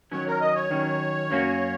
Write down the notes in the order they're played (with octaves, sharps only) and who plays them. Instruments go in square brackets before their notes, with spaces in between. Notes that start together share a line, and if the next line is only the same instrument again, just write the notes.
[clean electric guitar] D#3 F#3 C#4 [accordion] C#5
[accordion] A#4
D#5
C#5
[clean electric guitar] D#3 F#3 C#4
F#2 F#3 A#3 C#4 F#4